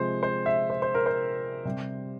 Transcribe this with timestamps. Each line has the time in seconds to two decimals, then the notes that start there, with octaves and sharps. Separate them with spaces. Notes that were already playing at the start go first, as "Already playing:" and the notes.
Already playing: C3 F3 G#3 C5
0.23 C5
0.46 E5
0.70 C5
0.82 C5
0.95 A#4
1.06 C5
1.65 C3 G3